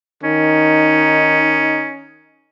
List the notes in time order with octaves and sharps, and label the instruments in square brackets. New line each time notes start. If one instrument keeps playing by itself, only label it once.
[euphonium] D#3 [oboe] C#4 [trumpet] D#4